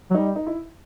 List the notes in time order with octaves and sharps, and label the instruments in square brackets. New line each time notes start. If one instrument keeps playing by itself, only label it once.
[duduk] F#3
[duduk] G3 [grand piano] D#4
[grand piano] D#4
E4